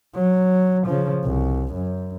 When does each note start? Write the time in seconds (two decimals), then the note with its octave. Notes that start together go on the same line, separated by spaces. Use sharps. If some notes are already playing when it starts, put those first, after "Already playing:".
0.14 F#3
0.87 C#3 F3
1.24 C2
1.74 F#2